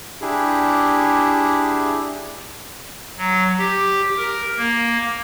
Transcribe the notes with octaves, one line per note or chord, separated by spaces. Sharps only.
D4 E4 G4 G#4
F#3
G4
A#4
A#3